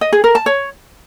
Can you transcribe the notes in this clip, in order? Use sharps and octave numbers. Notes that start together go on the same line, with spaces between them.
D#5
G#4
A#4
A5
C#5